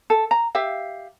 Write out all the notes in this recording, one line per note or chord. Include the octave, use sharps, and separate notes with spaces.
A4
A#5
G4 E5 F5